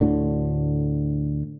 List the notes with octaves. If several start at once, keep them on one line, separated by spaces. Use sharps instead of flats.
D2 A2 D3